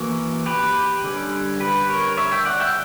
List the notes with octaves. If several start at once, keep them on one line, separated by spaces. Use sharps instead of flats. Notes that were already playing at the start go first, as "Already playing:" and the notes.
Already playing: E3 A#3 C#4 F#4 A#4
G4 B4
D3 G3 C#4
G4 B4
A#4 C#5
C#5 E5
E5 G5
D5 F#5
E5 G5